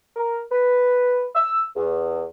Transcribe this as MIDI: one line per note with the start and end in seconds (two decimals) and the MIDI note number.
0.16 0.39 70
0.52 1.26 71
1.35 1.63 88
1.76 2.25 40